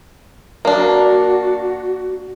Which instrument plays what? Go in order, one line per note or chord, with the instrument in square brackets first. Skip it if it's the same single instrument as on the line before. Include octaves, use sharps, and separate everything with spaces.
[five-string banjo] A#3 D4 [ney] F#4